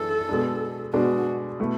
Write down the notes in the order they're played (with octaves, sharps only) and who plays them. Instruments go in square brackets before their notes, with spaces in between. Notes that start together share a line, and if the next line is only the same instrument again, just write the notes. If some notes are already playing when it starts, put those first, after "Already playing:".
Already playing: [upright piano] F#2 E3 B3 D4 G#4 [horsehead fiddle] A4
[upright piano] B2 G#3 D4
[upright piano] B2 G#3 D4 [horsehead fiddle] F#4
[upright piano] B2 A3 E4